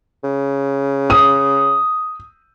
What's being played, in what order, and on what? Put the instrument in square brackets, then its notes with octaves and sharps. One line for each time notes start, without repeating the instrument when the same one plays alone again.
[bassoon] C#3
[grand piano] D#6